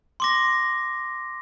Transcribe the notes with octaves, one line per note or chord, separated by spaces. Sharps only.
C6 D6 A#6